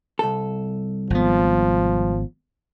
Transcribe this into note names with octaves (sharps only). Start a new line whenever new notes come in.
C2 A4
G#1 F3 B3